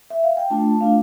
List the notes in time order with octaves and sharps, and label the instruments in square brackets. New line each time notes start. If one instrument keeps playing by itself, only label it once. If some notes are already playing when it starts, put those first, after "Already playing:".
[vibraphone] E5
F5
G5
A3 D4 F4 A5
A3 D4 F4 F5